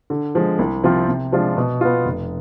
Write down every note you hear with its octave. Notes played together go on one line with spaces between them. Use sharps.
D3
F3 G#3
C2
C3 F3 C4 F4
C3
F3 G#3 D4 F4
B2
B3 F4
F1